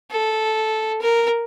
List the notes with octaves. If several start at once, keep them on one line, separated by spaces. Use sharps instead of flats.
A4
A#4